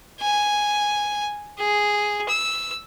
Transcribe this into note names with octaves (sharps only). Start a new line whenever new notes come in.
G#5
G#4
E6